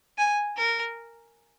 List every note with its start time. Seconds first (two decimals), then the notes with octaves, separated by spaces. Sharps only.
0.18 G#5
0.57 A#4